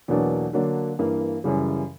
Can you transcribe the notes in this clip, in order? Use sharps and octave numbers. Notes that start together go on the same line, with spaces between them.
E2 B2 F#3 A#3 D4
D3 F#3 A#3 D4
G2 E3 A#3
F#2 C#3 E3 G3